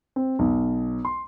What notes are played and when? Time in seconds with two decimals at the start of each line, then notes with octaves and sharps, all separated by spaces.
0.16 C4
0.39 B1
1.05 C6